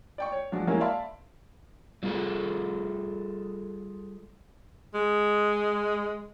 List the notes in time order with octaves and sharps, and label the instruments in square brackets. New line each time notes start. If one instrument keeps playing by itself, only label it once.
[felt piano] D5 G5 C#6
C#5
F3 F#3 G#3 D4 F#4
F#3 G#3 A#3 C#4 E4 G4
D5 E5 F5 A5 B5 C6
[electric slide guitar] F#3 G3 F4 G#4 A4
[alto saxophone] G#3